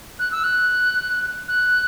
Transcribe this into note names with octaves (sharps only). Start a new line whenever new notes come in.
F#6
E6
F#6
F#6